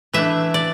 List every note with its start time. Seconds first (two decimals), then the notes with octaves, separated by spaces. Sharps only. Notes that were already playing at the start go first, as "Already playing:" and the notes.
0.13 E3 A3 D4 E5
0.54 D5